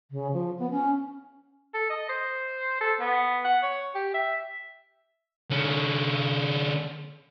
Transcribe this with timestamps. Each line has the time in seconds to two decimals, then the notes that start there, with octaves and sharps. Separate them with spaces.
0.11 C#3
0.33 F3
0.59 B3
0.71 C#4
1.74 A4
1.89 D#5
2.09 C5
2.81 A4
3.00 B3
3.45 F#5
3.63 C#5
3.95 G4
4.14 E5
5.50 D3 C#4